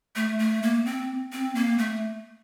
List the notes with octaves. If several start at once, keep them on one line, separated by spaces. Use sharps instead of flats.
A3
A3
A#3
C4
C4
A#3
A3